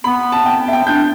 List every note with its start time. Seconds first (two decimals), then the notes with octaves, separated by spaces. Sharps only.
0.04 B3 B5
0.32 A5
0.46 G5
0.68 E5
0.73 G5
0.87 D4 G6